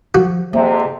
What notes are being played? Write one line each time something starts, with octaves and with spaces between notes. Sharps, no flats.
F3 F#4
F2 G#2 C3 A#3